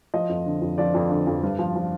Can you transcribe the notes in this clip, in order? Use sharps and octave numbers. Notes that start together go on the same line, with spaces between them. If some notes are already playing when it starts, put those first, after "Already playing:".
F3 D#5
F2
D3
F2
F3 D5
F2
D3
F2
G2
F3
F3